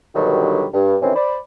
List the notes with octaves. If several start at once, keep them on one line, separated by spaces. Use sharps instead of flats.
G2 B2 D3 D#3 F#3 G3
G2
C3 D#3 E3 C4 C#4
C5 D5 B5